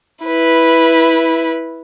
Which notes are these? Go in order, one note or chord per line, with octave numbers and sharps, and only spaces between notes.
E4 B4